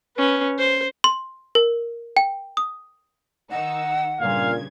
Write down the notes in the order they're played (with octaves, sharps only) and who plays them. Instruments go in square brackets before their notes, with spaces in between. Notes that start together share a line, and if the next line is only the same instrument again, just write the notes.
[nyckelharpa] C#4 B4
C5
[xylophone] C6
A#4
G5
D#6
[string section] D#3 D#4 E6 [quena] F#5
[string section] G2 C#3 G#6 [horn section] A#2 [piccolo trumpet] F5